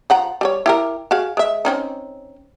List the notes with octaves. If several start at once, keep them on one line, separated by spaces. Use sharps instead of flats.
F3 F#5 A#5
G3 A4 C#5
E4 G4 A#4
F#4 G#4 F5
G#3 E5
C4 C#4 D#4